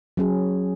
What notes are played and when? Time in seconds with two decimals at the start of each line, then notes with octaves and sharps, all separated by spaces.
0.17 F#3 C#4 G#4